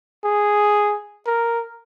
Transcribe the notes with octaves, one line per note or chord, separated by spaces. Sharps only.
G#4
A#4